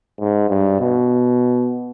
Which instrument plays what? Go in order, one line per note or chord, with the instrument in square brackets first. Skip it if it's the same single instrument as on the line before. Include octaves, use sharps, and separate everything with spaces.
[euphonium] G#2
G2
B2